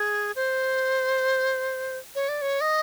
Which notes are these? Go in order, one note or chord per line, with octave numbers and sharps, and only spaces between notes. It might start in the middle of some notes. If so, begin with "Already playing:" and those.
Already playing: G#4
C5
C#5
D5
C#5
D#5